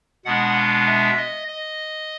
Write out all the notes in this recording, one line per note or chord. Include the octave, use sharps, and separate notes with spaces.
B2 G#3 B3 D4 F#5
F5
E5
D#5
D#5